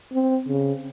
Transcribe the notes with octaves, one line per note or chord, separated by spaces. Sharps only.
C4
C#3